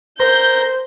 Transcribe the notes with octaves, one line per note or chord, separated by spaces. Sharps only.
A#4 C5 G6